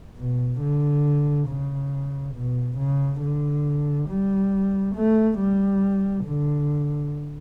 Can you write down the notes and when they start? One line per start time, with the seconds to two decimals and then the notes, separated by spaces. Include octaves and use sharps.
0.18 B2
0.60 D3
1.48 C#3
2.35 B2
2.77 C#3
3.21 D3
4.09 G3
4.95 A3
5.38 G3
6.25 D3